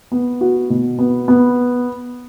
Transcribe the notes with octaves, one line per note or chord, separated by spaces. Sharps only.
B3
F#4
B2
B3
B3